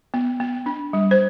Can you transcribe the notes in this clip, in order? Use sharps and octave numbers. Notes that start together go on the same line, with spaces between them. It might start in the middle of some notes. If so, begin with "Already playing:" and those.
B3
B3
D4
G3
C5